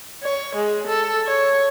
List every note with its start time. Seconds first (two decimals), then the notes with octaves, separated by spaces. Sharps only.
0.23 C#5
0.55 G#3
0.87 A4
1.27 C#5